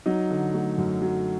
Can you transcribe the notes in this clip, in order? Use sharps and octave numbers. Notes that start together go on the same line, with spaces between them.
F#3 D#4
D3
A3
F#2
F#3